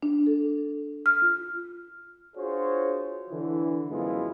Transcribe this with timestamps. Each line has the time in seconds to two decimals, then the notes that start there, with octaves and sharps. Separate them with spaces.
0.03 D4
0.27 A4
1.06 F6
1.22 F4
2.37 D4 F4 F#4 G#4 C5 C#5
3.30 D3 E3
3.90 F#2 F3 G#3 B3 E4 F4